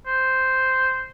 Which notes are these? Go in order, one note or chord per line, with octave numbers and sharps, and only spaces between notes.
C5